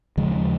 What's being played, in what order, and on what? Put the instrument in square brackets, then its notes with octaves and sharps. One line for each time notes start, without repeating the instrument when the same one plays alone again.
[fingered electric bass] D#2 C#3 F3 G#3